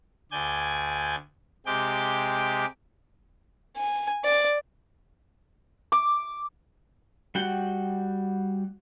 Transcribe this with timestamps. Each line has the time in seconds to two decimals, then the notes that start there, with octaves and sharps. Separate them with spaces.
0.32 D2 D5 G#5 G6 G#6
1.66 C3 G#3 G4 D6 G6
3.77 G#5
4.25 D5
5.92 D6
7.35 G3 F#4 F#5 G5